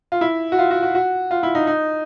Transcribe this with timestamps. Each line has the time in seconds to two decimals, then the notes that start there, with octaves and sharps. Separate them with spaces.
0.12 F4
0.21 E4
0.52 F#4
0.59 F4
0.71 F#4
0.83 F#4
0.95 F#4
1.31 F4
1.43 E4
1.55 D#4
1.67 D#4